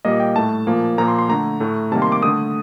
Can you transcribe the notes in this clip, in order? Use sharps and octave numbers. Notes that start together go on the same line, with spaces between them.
A#2 G3 A#3 D#5
G5
A2 A3 A5
A#2 F3 A#3
A#2 F3 A#3 A#5
C6
C6
D3 A3 A#5
A2 A3
C3 D#3 G3 A#3 A5
C6
D6
D3 A3 D#6